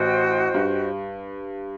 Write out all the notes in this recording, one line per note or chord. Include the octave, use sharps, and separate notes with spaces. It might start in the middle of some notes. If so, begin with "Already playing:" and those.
Already playing: A1 A2 F#4 C5 D#5 G5
G2